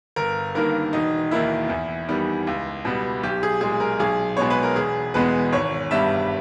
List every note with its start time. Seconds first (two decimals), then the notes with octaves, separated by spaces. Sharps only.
0.16 G1 A#4
0.55 G2 D#3 A#3 A#4
0.93 E1 D#4
1.31 D#2 D#3 A#3 E4
1.69 E2
2.08 D#3 G3 B3
2.47 C#2
2.85 B2 G3 B3
3.23 B1 G4
3.43 G#4
3.61 A#2 G#3 G#4
3.80 A#4
3.99 B1 G#4
4.37 B2 G#3 B3 C#5
4.50 B4
4.63 A#4
4.76 E1 G#4
5.14 E2 B2 G#3 B3 B4
5.52 G#1 C#5
5.91 G2 G3 B3 E5